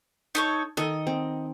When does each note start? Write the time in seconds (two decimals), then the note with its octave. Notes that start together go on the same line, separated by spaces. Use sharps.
0.35 D#4 A4 C#5
0.77 D#3 A4 D#5
1.07 C4